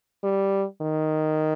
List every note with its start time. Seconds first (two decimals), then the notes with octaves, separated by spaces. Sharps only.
0.24 G3
0.81 D#3